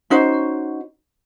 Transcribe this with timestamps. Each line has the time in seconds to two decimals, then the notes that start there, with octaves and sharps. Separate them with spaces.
0.10 C#4 D#4 F#4 C5